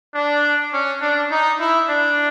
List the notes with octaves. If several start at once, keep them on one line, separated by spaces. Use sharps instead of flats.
D4
C#4
D4
D#4
E4
D4